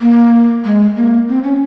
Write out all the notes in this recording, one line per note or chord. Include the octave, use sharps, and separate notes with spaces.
A#3
G#3
A#3
C4
C#4